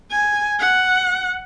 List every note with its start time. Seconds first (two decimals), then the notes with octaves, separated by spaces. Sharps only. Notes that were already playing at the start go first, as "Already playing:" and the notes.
0.11 G#5
0.59 F#5